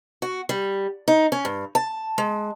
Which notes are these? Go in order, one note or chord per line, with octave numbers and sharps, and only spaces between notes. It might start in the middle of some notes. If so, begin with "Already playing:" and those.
F#4
G3
D#4
C#4
G2
A5
G#3